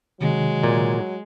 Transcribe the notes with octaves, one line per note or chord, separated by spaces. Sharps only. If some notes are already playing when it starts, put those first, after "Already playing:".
C3 D#3 F#3 G#3
A#2